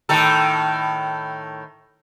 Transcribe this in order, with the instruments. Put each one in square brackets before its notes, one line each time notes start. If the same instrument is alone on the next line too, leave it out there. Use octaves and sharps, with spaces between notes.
[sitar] A2 D#3 A4